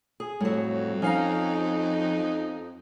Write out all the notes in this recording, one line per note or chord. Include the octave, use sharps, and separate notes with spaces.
G#4
F2 A2 F#3 G3
F3 C#4 D#4 F5 A#5